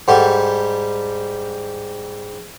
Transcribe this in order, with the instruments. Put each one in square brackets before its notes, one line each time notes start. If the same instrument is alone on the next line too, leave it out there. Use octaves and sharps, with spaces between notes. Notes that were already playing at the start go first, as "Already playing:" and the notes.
[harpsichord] G#2 G3 [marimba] A4 F#5 G5